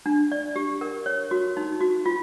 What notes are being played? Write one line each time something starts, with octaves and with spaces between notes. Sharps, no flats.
D4
D5
G4
A#4
C#5
F#4
D#4
F#4
F4